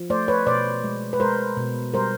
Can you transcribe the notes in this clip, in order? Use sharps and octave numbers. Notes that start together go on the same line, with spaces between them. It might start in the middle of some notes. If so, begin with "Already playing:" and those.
Already playing: F3
A3 C5 D5
B4 C#5
B2 C5 D5
G#3
B4
G#3 A#4 C5
B2
G3 A#4 C5